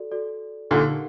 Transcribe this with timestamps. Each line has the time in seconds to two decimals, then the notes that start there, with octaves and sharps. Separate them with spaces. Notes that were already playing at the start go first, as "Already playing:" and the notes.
Already playing: F#4 A4 D5
0.12 F#4 A4 D5
0.71 A#2 D3 D#4 G4 A#4 F#5